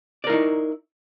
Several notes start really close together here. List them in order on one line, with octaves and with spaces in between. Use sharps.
D5 A#4 E4 D#4